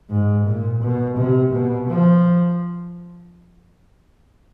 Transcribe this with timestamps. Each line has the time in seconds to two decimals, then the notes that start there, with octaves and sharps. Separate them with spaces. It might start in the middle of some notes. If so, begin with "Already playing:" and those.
0.10 G#2
0.46 A#2
0.82 B2
1.17 C3
1.53 B2
1.89 F3